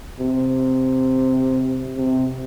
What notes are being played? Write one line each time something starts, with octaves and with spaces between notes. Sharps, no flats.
C3
C3